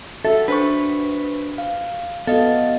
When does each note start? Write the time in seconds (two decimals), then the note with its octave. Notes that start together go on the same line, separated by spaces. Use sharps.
0.25 F#4 A4 E5
0.48 D4 B4 C5 C#6
1.58 F5
2.27 B3 F#4 A4 D#5 F5